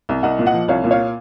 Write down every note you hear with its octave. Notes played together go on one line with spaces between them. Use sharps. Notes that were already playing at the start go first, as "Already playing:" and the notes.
C2
C2 D#5 F#5
A#2
D#5 F#5
F3
C2 C#5 F5
A#2
C#5 F5